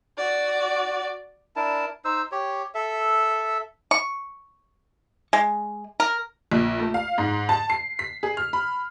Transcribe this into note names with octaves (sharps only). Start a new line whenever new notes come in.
F#4 D5
D4 E4 A#4 A5
D#4 C5 E6
G4 C#5
A4 E5
C#6
G#3
A#4
A#1
A3
F5
G#2
A5
C7
B6
G#4
F6
B5